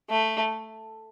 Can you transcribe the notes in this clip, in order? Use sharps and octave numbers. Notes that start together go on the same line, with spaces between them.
A3